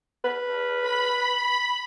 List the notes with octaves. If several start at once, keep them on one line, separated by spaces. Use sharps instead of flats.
B4
B5